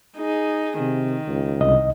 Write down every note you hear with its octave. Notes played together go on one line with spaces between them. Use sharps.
D#4 G#4
C3 D#3
C#2
C2 D#5